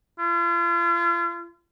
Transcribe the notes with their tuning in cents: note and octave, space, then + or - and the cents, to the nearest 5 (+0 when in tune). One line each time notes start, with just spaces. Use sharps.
F4 -40